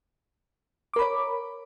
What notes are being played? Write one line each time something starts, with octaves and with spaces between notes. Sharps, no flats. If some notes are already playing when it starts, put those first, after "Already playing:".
A#4 C#5 B5 D6